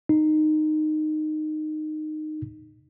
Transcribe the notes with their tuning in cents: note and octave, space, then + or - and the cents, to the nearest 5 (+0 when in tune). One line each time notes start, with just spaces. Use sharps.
D#4 -15